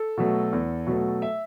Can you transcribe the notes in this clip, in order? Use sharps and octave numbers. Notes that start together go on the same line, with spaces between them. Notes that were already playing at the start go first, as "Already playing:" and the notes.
Already playing: A4
B2 F#3 A3
E2
B2 F#3 A3
E5